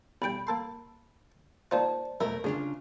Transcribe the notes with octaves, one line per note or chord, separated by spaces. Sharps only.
B1 G3 G5 B5 D7
A#3 A4 C6
A#3 D#4 F4 C5 D5 A5
E2 B2 A3 A#4 E5 B5
D2 C#3 D4 F4 G#4